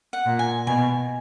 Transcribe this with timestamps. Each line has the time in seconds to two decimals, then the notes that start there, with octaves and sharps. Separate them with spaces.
0.13 F#5
0.26 A#2
0.39 G#5
0.67 B2 G#5